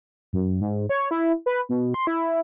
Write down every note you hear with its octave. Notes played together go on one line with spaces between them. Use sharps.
F#2
G#2
C#5
E4
B4
B2
C6
E4